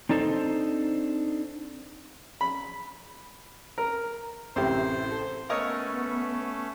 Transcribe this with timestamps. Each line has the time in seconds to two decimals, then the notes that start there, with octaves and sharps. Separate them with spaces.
0.09 C4 D4 D#4 A4 B4 C5
2.41 B5
3.78 A#4
4.56 A1 A2 C3 E4 G4 A#4 C5
5.11 A4
5.50 A3 B3 C#4 A4 A#4 C#5 D#5